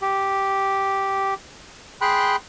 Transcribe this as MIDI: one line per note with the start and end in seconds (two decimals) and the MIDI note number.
0.02 1.34 67
2.01 2.36 68
2.01 2.36 79
2.01 2.36 83
2.01 2.36 84
2.01 2.36 90